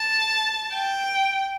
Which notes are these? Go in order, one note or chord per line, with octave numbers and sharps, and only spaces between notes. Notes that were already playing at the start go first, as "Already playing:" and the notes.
Already playing: A5
G5